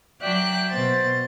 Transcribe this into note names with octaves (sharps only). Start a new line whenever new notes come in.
F#3 D5 E5 G5 D6 F#6
B2 C5 A6